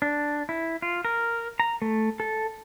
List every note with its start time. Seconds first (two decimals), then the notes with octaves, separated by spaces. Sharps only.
0.02 D4
0.49 E4
0.82 F4
1.05 A#4
1.60 A#5
1.82 A3
2.20 A4